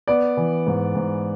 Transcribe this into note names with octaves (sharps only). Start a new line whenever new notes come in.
B3 D5
E3
G#2
G#2